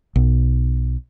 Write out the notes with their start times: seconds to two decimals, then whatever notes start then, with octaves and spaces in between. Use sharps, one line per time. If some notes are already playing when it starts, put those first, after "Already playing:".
0.16 B1